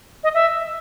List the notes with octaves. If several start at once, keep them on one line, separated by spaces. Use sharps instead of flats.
D#5
E5